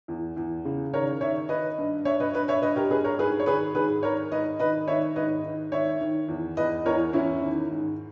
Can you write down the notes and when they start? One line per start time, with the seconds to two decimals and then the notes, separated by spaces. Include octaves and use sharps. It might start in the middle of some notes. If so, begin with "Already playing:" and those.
0.08 E2
0.37 E2
0.65 C#3
0.92 D#3 A#4 C#5
1.21 D#3 C#5 E5
1.49 D#3 B4 D#5
1.78 G2
2.05 G2 C#5 E5
2.20 B4 D#5
2.33 G2 B4 D#5
2.48 C#5 E5
2.62 G2 B4 D#5
2.76 G4 A#4
2.90 G2 G#4 B4
3.04 A#4 C#5
3.19 G#2 G#4 B4
3.40 C#5
3.46 D#3 G#4 B4
3.75 G#2 G#4 B4
4.03 D#3 A#4 C#5
4.31 G#2 B4 D#5
4.59 D#3 B4 D#5
4.88 D#3 C#5 E5
5.16 G#2 B4 D#5
5.44 D#3
5.72 D#3 C#5 E5
6.01 D#3
6.28 E2
6.57 E2 B4 D#5
6.86 E2 A#4 C#5
7.13 E2 C#4 E4
7.42 D#3
7.70 G#2